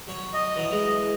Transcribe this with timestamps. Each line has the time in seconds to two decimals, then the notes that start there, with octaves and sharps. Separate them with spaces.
0.08 F#3 C#5
0.33 D#5
0.56 E3 F#3
0.70 E3 G#3